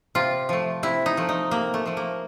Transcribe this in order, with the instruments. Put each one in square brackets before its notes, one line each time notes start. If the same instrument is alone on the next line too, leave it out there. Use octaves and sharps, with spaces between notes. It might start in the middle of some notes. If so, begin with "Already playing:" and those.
[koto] C3 F4
F3 A3
C3 E4
D#4
F3 A3
D#4
C3 A#3
A3
F3 A3
A#3